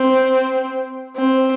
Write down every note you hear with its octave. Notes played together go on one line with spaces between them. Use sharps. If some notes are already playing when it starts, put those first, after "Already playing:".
Already playing: C4
C4